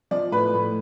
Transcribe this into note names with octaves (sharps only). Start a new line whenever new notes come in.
F3 D5
A2 B4
A2